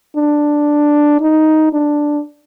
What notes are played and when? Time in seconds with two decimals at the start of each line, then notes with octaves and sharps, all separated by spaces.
0.17 D4
1.21 D#4
1.73 D4